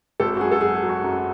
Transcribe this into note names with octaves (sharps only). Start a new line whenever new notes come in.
G#1 A4
F#4
F#2 G#4
A4
F#3 G#4
G#4
F#3
F#4
F#2